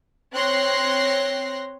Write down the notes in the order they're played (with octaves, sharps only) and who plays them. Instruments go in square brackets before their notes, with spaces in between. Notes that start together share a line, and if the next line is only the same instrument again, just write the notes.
[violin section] C4 C#5 C6 F#6 A#6 C7